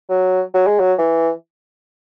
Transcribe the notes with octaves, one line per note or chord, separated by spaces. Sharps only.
F#3
F#3
G#3
F#3
E3